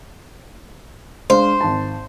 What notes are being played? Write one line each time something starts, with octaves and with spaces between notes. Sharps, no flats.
G#3 D4 C5 F5
G#1 A5